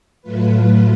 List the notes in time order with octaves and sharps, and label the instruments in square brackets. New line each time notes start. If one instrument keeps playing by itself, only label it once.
[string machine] A2 F#3 A3 F4 B4